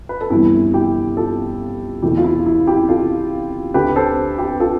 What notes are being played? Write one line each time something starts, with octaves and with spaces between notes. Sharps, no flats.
B4
A4
G1 F2 E3 G3 E4 G4
E4 G4
F4 A4
E1 E2 B2 A3 E4 G4
F4
E4
E4
E4 G4
F4 A4
D2 D3 A3 G4 B4
A4 C5
G4 B4
F4 A4